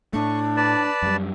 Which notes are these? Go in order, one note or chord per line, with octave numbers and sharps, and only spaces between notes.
A2 A3 D4 C#6
B4 D5 A5
F#2 G3